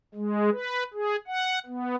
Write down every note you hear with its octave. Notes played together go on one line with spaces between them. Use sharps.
G#3
B4
G#4
F#5
B3